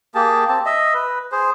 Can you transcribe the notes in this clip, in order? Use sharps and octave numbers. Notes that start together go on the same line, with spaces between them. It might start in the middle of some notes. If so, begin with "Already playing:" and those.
A#3 G4 G#4 A5
C4 A5
D#5 E5
B4
G#4 C5